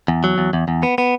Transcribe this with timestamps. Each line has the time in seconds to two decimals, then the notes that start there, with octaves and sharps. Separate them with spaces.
0.08 E2
0.24 F#3
0.38 E2
0.53 E2
0.68 E2
0.83 B3
0.98 B3